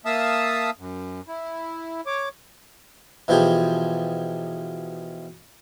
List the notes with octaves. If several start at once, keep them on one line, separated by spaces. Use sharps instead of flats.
A#3 E5 F5 A5 D#6 E6
F#2
E4
C#5 D6
B2 E3 F3 F4 G4 G#4